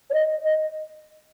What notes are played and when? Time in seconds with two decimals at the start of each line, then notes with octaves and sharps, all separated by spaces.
0.10 C#5
0.14 D#5
0.44 D#5